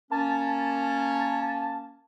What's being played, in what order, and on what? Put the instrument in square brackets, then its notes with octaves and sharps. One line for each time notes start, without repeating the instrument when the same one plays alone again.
[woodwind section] A#3 C#4 [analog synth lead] A5